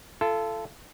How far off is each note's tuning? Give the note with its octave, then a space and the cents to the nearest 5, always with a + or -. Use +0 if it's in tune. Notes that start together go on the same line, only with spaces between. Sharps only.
F4 -35 A4 +0